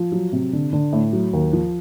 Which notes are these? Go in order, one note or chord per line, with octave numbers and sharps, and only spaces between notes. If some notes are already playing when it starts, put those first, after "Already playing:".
Already playing: F3
F#3
C3
D3
D3
A2
F#3
D#2
F3